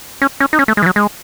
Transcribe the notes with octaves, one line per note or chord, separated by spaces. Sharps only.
C#4
C#4
D#4
C#4
A3
G#3
E3
F#3
G#3